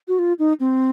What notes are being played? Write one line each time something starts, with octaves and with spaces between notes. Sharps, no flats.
F#4
F4
D#4
C4